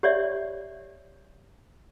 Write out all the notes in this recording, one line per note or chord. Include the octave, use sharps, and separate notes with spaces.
G4 C#5 D5 E5